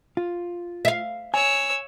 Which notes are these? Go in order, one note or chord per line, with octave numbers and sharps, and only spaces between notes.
F4
E5 F5
C#5 G#5 E6